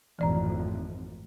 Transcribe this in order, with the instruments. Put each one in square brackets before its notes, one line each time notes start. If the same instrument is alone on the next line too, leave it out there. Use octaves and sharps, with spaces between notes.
[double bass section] G#1 F2 A2 [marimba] E3 D5 A#5